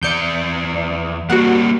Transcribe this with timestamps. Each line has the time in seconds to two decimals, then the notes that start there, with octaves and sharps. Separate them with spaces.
0.03 E2 D5 G6 C#7
1.30 G3 A#3 F#4 F#5